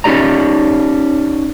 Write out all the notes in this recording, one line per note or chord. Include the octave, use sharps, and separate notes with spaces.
C#4 D#4 G4 D5 A#5